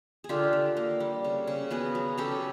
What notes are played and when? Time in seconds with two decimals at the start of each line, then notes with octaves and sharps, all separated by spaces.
0.24 G#4
0.29 D3 F4 G4
0.53 D3
0.77 A#3
1.00 G3
1.24 C#3
1.47 C#3
1.71 B3 F#4 G#4
1.95 F#3
2.18 C#3 G4 A4